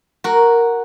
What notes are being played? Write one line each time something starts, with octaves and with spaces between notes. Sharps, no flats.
F#4 A#4